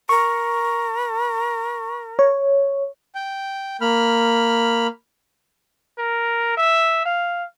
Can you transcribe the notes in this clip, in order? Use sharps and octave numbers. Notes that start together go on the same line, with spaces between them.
A#4 C#6
C#5
G5
A#3 B5 F6
A#4
E5
F5